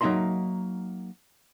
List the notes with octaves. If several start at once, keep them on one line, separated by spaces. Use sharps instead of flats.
F#3 A#3 D#4 E5 A#5 C6